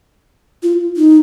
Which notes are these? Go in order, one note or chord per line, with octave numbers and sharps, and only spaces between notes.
F4
D#4